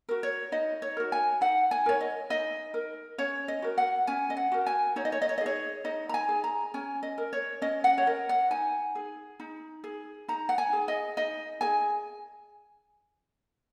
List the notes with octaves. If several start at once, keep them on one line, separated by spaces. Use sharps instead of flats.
F#4 A#4
C#5
D#4 D#5
C#5
F#4 A#4
G#5
D#4 F#5
G#5
A#4 C#5
D#5
D#4 D#5
A#4
C#4 C#5
D#5
F#4 A#4
F#5
C#4 G#5
D#5
F#5
F#4 A#4
G#5
D#4 C#5
D#5
C#5
D#5
C#5
D#5
G#4
C#5
D#4 D#5
A#5
G#5
G#4
A#5
C#4 G#5
D#5
A#4
C#5
C#4 D#5
F#5
C#5
A#4 D#5
F#5
D#4 G#5
G#4
D#4
G#4
D#4 A#5
F#5
G#5
G#4
D#5
D#4 D#5
G#4 G#5